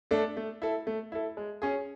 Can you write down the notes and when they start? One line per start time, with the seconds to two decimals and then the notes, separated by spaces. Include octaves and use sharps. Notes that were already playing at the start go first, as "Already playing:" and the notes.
0.11 A3 D4 A4
0.37 A3
0.62 E4 A4
0.87 A3
1.12 E4 A4
1.37 G#3
1.62 C#4 G#4